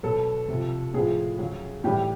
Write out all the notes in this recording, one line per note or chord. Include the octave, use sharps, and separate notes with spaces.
B2 F#3 A4
C3 F3
A2 F3 G#4
C#3 F#3
A2 E3 G3 G4